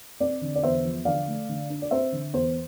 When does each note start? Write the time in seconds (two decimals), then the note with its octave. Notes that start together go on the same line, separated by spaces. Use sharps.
0.20 C4 D5
0.41 D3
0.55 D5
0.63 E2 C5 E5
0.85 F3
1.05 D3 D5 F5
1.28 A3
1.49 D3
1.70 D4
1.82 D5
1.91 C4 C5 E5
2.12 D3
2.33 E2 C5